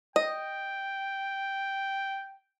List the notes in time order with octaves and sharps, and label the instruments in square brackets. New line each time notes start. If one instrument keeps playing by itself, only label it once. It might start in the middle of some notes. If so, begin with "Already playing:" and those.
[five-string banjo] D#5 [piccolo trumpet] G5